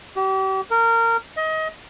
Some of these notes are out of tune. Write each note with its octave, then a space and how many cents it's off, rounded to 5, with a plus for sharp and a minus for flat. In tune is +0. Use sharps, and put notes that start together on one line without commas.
G4 -40
A#4 -20
D#5 +25